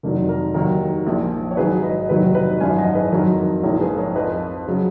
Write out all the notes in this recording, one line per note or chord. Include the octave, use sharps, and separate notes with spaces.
F1 F2 D#3 F#3 A#4
A#4
D#2 D#3 F#3 A#4
A#1 A#2 F3
C#5
G#1 G#2 F#3 G#4 B4
B4 D#5
F1 D#2 D#3 F#3 B4 D#5
B4 D#5
G#1 F#2 F3 F5 G#5
D#5 F#5
G#4 B4
F2 D#3 F#3 A#4
A#1 G#2 F3 A#4 C#5
G#4 B4
A#4 C#5
F2 F3 B4 D#5
C#3 F#3